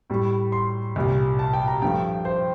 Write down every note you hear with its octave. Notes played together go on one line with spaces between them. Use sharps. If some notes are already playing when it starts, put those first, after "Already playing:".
A2 G3
C6
C2 A#2 G3
A5
G5
A#5
G2 F3 A3 G5
C5